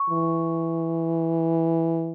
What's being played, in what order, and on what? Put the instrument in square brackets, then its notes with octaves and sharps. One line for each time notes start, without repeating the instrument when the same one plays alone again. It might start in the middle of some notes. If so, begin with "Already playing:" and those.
Already playing: [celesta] C#6
[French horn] E3